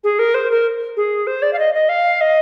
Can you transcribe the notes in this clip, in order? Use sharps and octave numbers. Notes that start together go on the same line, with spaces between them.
G#4
A#4
C5
A#4
G#4
C5
D5
F5
D#5
D#5
F5
D#5